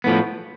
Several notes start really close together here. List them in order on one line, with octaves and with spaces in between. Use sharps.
B3 A2 F3